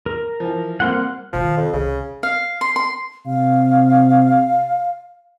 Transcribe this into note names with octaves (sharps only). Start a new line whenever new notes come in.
A#4
E3 F3
G3 A#3 C4 F#5 C6 F6
B2 D#3 F3
F2
C2 C#3
F5
C6
C6
C3 F5